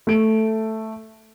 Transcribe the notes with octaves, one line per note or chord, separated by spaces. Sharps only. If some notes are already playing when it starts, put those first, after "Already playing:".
A3 D7